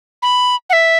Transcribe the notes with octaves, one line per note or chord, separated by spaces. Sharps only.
B5
F#5
E5